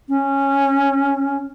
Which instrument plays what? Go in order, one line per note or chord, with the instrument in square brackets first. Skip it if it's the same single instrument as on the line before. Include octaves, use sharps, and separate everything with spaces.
[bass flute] C#4